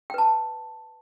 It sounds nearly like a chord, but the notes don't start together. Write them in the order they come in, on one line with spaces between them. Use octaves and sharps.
G5 B4 A5